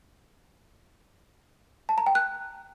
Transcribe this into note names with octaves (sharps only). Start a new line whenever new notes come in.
A5
A#5
G5
F#6